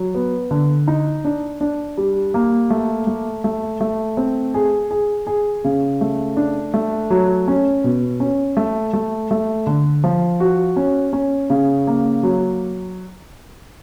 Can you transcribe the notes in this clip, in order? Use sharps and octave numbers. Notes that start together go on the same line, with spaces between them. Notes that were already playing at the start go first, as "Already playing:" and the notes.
Already playing: F#3
B3
D3
D#4
D4
D4
G3
A#3
A3
A3
A3
A3
C4
G#4
G#4
G#4
C#3
A3
D4
A3
F#3
C#4
B2
C#4
A3
A3
A3
D3
F3
F#4
C#4
C#4
C#3
A#3
F#3